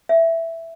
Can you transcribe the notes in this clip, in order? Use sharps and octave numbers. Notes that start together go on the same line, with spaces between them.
E5